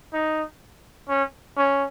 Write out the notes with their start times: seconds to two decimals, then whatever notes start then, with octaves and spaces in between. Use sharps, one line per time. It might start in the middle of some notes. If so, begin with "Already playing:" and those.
0.13 D#4
1.09 C#4
1.57 C#4